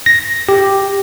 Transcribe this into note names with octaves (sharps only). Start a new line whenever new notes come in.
A#6
G4